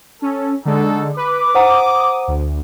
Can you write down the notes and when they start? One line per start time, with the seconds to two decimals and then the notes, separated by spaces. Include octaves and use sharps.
0.22 C#4 A4
0.65 D3 G#3 D#4 F#4 A4
1.16 B4 D6
1.55 C5 F#5 A#5 D#6
2.28 D2